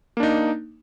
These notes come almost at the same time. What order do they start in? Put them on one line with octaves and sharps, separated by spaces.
A#3 D4 D#4